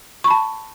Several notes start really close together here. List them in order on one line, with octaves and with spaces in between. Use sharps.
C#6 B5 A5